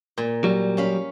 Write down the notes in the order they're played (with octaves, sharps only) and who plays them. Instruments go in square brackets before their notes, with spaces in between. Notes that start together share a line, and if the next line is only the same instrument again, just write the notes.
[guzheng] A#2
[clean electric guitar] F#3 G3
[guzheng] C#4 F5 B5